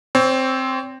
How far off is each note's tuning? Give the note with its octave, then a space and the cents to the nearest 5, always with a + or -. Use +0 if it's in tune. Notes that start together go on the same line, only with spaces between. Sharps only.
C4 +0 C#5 +35